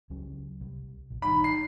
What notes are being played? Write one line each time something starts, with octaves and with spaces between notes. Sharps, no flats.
C#2 F#3 C#4
C2
A#1
G1 G2 D#3 D#4 B5
C7